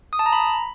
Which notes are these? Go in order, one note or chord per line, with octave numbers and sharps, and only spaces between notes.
D#6
A5
A#5
B5